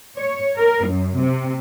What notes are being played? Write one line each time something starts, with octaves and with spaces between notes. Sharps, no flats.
C#5
A#4
F#2
C3